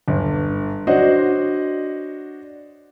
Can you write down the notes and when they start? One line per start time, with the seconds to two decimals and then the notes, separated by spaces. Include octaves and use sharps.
0.08 G1
0.87 D4 F#4 C5 C#5 D#5